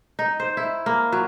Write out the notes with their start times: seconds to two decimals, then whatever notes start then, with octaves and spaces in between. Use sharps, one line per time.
0.19 D#4
0.40 C5
0.57 E4
0.86 A#3
1.12 F#3